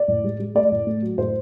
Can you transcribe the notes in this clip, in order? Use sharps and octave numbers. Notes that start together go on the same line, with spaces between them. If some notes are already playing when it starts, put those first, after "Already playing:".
Already playing: D5
A2
G#3
G#3
A3 D5
A2
A3
F#3
A2 C5